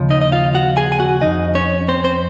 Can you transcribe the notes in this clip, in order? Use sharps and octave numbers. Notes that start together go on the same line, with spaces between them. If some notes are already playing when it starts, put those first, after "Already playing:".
Already playing: D#2 C#3 F3
D#4 D#5
D#5
F4 F5
F#4 F#5
G#4 G#5
G#5
F#4 F#5
F2 D#3 D#4 D#5
C#4 C#5
C4 C5
C4 C5